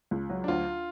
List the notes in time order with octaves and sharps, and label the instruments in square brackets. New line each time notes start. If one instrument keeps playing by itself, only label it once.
[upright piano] C#2
F#3
[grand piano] D4
[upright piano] D2 [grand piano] F4